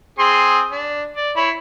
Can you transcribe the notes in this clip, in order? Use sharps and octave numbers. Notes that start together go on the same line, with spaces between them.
C4 G#4 C6
D4
D5
E4 C#5 B5